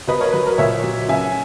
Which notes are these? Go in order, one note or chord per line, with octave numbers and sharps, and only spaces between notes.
B2 B4 D#5
A#4 C#5
F#3 B4
A#4
A#2 C#5 E5
F#3
C#3 E5 G#5